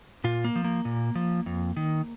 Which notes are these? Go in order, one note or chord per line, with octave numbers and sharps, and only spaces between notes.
A#2 F4
A#3
F3
A#3
A#2
F3
F2
D#3